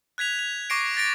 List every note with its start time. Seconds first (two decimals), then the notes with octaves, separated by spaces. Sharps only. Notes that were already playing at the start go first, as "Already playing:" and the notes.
0.18 F#6 G#6 B6 F7
0.39 F7
0.70 C#6 D6 A#6 C7 D7
0.97 A6 A#6 D7